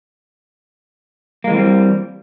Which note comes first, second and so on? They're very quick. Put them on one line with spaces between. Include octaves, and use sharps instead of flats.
A#3 G#3 E3 C4 G3